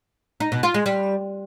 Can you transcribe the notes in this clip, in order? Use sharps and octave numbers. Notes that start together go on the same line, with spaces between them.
D#4
B2
F4
G#3
G3